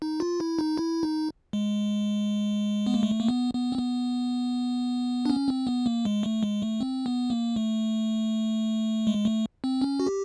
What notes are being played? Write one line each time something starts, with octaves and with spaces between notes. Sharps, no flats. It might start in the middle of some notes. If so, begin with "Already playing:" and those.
D#4
F4
E4
D#4
E4
D#4
G#3
B3
A#3
A3
A#3
B3
B3
C4
B3
D4
C#4
C4
B3
A#3
G#3
A3
G#3
A3
C4
B3
A#3
A3
G#3
A3
C4
C#4
F#4
G4